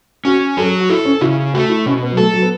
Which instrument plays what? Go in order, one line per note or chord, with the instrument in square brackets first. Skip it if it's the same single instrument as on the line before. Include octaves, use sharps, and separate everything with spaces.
[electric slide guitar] C#4 [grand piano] F#4
[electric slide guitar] F#3 [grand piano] A4
[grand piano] F#4
[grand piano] E4 [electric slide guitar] A4
[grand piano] C#4
[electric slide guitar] C#3 [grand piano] E4
[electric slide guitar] A3 [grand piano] F#4
[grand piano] E4
[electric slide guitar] B2 [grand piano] C#4
[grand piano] B3
F#3
[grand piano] A3 [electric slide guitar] A4
[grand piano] F#3
B3